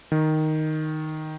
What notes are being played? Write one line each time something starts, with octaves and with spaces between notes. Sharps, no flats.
D#3